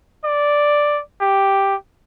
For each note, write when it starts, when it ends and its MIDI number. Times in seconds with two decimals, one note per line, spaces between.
0.24 1.02 74
1.21 1.75 67